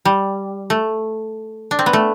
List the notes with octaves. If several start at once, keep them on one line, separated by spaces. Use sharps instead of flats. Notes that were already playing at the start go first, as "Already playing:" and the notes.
G3
A3
D4
C4
B3
A3